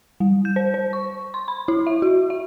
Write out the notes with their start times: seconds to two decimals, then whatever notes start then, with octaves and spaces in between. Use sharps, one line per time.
0.20 G3
0.45 G6
0.56 C5
0.74 C5
0.93 C#6
1.34 C6
1.48 B5
1.68 E4
1.87 E5
2.02 F#4
2.30 E5